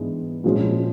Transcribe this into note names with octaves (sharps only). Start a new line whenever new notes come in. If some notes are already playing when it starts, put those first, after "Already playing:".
Already playing: G#2 E3 G#3 B3 D4
A#2 F3 G#3 C#4